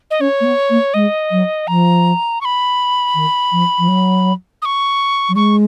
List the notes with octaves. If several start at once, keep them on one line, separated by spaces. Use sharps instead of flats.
D#5
C#4 C#5
A#3
B3
A#3
G#3 D#5
F#3
F3 A#5
C#6
B5
D#3
F3
F3
F#3
D#6
C#6
F#3
G#3 C#6